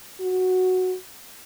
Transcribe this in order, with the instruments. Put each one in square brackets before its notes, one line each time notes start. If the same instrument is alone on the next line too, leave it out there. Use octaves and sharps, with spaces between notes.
[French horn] F#4